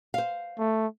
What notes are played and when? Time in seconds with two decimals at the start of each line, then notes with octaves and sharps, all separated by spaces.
0.14 C5 F5
0.59 A3